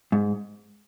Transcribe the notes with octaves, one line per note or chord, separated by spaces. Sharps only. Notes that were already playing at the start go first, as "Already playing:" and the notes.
G#2